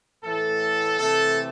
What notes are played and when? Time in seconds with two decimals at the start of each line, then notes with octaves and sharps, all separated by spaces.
0.23 A2 E3 A3 A4
0.98 C3 E3 A3 A4